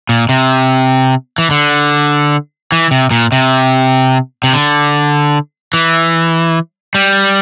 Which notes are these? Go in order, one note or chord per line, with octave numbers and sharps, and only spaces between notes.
A#2
C3
E3
D3
E3
C3
A#2
C3
C3
D3
E3
G3